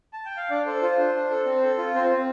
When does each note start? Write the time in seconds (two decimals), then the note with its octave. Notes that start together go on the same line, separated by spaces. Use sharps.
0.13 A5
0.26 G5
0.37 F5
0.51 D4 D5
0.66 A4 C5
0.82 F4 C5
0.98 D4
1.14 D4
1.30 A4
1.46 C4
1.62 A4
1.78 F4
1.94 C4 C5
2.10 C4